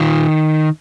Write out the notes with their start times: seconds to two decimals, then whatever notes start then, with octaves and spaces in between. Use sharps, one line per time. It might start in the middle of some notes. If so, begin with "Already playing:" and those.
Already playing: D#3 F4